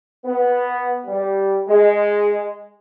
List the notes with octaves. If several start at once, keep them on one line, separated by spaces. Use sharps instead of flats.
B3
G3
G#3